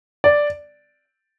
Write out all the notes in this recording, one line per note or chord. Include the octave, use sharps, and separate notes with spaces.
D5